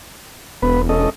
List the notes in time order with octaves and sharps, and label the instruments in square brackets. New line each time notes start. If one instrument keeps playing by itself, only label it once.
[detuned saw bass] E1 [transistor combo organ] B3 B4
[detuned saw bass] E1 [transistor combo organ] C#4 A4 D#5